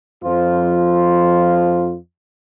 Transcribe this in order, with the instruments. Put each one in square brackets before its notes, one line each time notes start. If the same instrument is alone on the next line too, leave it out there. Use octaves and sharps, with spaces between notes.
[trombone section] F2 F3 F4